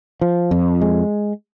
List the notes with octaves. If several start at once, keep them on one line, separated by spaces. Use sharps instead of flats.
F3
F2
G#3